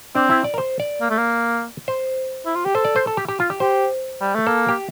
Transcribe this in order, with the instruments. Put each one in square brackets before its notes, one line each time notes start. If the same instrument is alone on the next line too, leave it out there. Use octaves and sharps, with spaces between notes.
[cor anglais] C4 [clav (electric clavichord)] D4
[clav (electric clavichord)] E4
D5
A#4
C5
D5
[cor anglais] A#3
A3
A#3
[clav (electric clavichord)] C5
[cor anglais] E4
F4
G4
[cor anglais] A4 [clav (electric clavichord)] C5
[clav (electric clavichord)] D5
C5
A4
G4
G4
F4
G4
[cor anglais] G4 [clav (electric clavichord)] C5
[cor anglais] G3
A3
[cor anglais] A#3 [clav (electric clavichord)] A4
[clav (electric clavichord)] G4